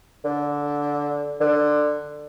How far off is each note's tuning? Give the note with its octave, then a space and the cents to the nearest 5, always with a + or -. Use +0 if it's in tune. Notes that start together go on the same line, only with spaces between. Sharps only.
D3 -10
D3 +15